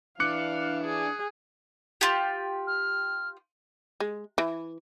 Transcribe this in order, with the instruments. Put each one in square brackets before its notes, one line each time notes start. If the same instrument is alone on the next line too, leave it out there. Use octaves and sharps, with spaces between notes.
[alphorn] E3 [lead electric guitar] D4 D5 [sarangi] F5 [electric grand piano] D6 F#6 C#7
[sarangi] G#4
[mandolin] F4 G4
[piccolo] F6
[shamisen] G#3
E3